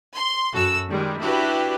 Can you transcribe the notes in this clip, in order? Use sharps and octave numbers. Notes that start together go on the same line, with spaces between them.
C6
F#2 F#4 A4 E6
D#3 G3 G#3
D4 E4 F#4 G4 B4